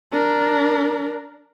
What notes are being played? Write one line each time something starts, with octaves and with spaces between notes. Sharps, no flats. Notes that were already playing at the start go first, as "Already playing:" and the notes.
D4 A#4